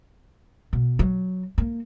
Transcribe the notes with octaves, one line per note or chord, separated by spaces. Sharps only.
B2
F#3
A#3